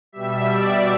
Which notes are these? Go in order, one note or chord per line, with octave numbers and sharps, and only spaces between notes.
B2 G3 E5
D5